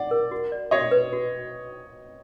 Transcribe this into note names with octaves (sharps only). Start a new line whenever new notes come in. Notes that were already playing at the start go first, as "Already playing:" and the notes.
Already playing: D5 F#5
A#4
F#4
D5
F#4 C#5 D#5
B4
F#4